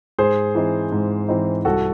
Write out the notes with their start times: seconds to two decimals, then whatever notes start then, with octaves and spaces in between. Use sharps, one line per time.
0.18 G#2 G#4 C5
0.55 E3 C4 D#4
0.92 G#2
1.29 E3 C4 D#4
1.65 C2 F#4 A4